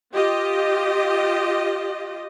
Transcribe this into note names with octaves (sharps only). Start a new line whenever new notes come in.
F4 G4 D#5